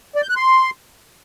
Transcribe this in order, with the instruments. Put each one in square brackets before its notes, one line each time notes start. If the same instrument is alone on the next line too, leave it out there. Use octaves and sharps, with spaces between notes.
[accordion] D5
G6
F#6
C6